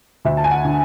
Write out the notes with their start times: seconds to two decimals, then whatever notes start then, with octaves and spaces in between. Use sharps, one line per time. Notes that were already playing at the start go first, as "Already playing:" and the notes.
0.25 D2 E5
0.37 A5
0.44 G#5
0.51 F#5
0.65 D3